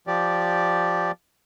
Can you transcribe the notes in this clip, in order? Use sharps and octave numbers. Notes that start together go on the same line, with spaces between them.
F3 G4 D5